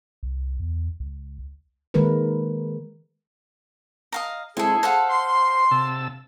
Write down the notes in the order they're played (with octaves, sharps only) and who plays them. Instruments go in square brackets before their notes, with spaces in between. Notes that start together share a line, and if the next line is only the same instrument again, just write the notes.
[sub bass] C2
E2
C#2
[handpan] D#3 G#3 A#3 A#4 B4
[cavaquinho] D#5 F5 A#5
[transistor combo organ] G#3 C4 E4 [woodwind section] G#4 [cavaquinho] A4 G#5
[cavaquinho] A4 F5 F#5 [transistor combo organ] C5
[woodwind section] C6
[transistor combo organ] C3 A5 E6